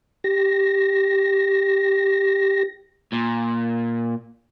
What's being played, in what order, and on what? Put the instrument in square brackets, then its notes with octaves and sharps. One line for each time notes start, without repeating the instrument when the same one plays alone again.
[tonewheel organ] G4 A#6
[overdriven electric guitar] A#2